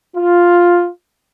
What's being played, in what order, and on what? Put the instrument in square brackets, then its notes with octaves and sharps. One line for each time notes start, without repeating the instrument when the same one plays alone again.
[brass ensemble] F4